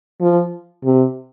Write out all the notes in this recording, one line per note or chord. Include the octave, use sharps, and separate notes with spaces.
F3
C3